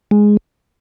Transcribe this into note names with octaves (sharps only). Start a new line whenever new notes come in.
G#3